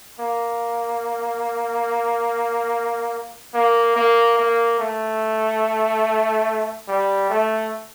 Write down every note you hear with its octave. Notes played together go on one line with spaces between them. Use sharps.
A#3
A#3
A#3
A#3
A3
G3
A3